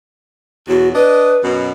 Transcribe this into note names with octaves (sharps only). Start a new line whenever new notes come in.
E2 B2 F#3 F#4
D4 B4 D#5
F#2 B2